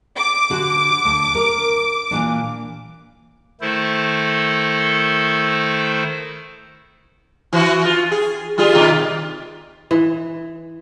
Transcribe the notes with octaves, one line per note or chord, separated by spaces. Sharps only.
D6
D3 F#4
D2
A#4
A#2 E3 D4
D#3 A3 E4 A4 C5
E3 F#4
F4
G#4
G3 F4 G#4
B2 D#3 F4
E3